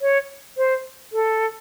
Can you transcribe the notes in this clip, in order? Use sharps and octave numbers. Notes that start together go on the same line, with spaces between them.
C#5
C5
A4